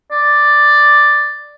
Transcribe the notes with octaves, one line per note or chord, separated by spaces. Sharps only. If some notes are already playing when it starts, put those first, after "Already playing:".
D5